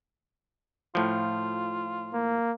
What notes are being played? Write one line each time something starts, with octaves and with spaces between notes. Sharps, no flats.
A2 F3 F4
A#3